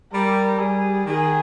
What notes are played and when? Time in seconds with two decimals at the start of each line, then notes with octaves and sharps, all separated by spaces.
0.13 G3 A#4
0.59 G3 G#4
1.05 D#3 G#4